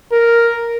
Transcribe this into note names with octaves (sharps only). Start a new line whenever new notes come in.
A#4